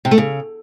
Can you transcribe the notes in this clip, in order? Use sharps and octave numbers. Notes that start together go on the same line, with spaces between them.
C3
A3
C#3